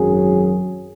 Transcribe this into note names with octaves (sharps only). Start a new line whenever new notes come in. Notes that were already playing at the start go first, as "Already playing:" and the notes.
Already playing: G#1 F#2 F#3 G#4